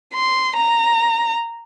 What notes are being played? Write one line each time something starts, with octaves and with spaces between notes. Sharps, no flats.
C6
A#5